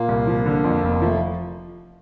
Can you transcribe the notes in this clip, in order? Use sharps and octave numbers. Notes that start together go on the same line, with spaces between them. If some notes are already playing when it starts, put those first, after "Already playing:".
Already playing: A#2 A#3
C2
F3
D3
F2
F1
F3 A3